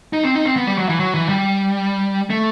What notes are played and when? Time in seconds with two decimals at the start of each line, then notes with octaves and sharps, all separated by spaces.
0.13 D#4
0.24 C4
0.35 D#4
0.45 C4
0.56 B3
0.67 G3
0.78 F#3
0.89 E3
1.00 F#3
1.15 E3
1.29 G3
2.30 A3